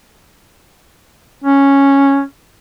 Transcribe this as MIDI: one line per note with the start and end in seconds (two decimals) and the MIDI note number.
1.44 2.22 61